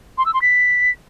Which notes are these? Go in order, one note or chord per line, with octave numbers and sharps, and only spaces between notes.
C6
E6
C6
B6